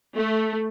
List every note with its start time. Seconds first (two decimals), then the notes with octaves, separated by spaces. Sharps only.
0.16 A3